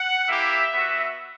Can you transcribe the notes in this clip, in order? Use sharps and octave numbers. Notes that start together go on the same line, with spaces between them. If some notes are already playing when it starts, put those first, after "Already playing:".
Already playing: F#5
A#3 E4 G4 E5
B3 F#4